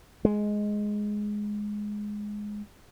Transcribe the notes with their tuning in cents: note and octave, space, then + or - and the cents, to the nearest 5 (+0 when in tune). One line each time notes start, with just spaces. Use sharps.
G#3 +5